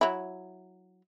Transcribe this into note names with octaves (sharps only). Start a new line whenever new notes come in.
F#3 E4